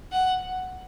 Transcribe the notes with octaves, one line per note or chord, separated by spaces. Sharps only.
F#5